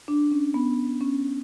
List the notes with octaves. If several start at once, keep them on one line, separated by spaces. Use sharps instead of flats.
D4
C#4
B3
C#4